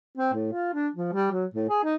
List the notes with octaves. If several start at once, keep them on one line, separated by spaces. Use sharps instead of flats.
C4
A2
F4
D4
F3
G3
F#3
A2
G#4
D#4